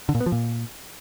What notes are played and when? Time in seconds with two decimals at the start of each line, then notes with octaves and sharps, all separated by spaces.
0.09 D3
0.15 A#2
0.20 B3
0.26 F3
0.32 A#2